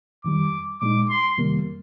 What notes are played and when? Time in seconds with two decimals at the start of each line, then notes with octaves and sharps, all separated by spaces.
0.24 F2 D#3 G3 D6
0.81 A#2 G#3 D#4 D6
1.10 C6
1.38 F2 C3 D#3 G3 A#3